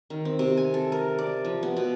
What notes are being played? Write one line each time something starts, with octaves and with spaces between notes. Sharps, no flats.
D#3
C4
C3
G#5
A4
A#4
D5
F3
B3
B2